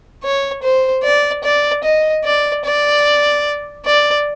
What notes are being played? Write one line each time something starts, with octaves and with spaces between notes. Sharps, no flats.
C#5
C5
D5
D5
D#5
D5
D5
D5